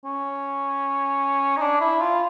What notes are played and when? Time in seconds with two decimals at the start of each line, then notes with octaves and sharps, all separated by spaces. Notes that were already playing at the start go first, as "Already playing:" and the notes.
0.05 C#4
1.57 D#4
1.61 D4
1.81 E4
2.00 F4